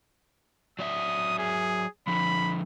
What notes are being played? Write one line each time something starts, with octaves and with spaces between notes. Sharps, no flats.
F#3 D5 E5 D#6
G#4
D3 F3 B5